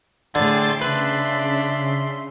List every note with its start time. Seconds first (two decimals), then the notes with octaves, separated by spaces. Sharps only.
0.35 A2 D3 G#4 G5 C6 E6 A6
0.81 C#3 D4 B4 E5 C6